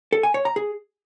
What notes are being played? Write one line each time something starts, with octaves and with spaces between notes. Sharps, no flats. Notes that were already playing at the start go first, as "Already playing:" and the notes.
A4
G#5
C#5
A#5
G#4